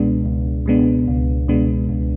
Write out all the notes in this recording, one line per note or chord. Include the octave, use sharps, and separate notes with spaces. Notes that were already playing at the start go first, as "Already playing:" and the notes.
Already playing: C#2 B2 G#3 B3 D4
C#2
B2 G#3 B3 D4
C#2
B2 G#3 B3 D4
C#2